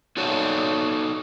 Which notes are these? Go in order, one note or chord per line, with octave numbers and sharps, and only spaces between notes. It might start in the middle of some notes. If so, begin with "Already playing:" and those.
D#4 F#4 A4 C#5 D5